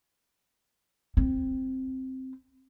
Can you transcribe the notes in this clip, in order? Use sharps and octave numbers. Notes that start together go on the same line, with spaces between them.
C4